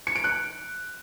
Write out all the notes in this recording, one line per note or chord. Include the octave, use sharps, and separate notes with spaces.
C#7
D7
F#6